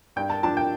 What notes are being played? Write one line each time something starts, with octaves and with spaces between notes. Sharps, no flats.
G2 G5
A5
F3 D4 A5
G5